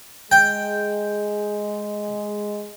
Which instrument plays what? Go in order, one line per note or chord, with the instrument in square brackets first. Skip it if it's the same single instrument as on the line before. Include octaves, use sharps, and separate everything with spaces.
[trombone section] G#3 [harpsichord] G5